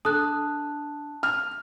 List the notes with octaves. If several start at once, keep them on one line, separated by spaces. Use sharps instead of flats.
D4 A4 A5 D#6 F#6
F6